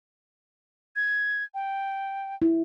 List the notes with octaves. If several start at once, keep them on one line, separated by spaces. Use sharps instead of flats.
G#6
G5
E4